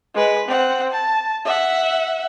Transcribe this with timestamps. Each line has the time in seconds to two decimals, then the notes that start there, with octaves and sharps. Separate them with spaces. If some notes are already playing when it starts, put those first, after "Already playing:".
0.15 G#3 B4
0.48 C4 F#5
0.92 A5
1.45 E5 F#5